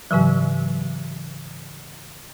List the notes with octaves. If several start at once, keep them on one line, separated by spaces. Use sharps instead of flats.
G#2 C#3 E3 F#3